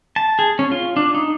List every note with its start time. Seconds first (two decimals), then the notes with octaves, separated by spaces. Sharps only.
0.16 A5
0.39 G#4
0.59 C#4
0.72 F4
0.96 D4
1.15 D#4